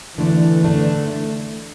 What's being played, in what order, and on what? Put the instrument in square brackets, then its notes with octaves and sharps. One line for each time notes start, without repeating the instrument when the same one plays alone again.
[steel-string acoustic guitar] D3 A3 D4 [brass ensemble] E3
[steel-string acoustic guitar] D3 A3 D4